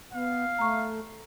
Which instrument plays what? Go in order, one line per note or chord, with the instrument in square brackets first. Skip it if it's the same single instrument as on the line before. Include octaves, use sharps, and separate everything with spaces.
[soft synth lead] B3 [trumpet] F5
[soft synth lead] A3 [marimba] A#5 C#6